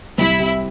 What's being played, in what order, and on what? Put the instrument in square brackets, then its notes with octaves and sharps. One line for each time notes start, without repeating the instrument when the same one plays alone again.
[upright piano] C2 [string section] E4
[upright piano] C3